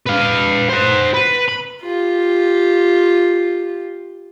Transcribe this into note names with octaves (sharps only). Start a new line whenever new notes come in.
B4 F5
C5 F#5
B4
B5
F4 G4